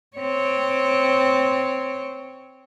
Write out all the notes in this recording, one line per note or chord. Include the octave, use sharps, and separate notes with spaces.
C4 C#5